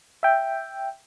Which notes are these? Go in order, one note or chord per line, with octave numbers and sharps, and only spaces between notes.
E5 G5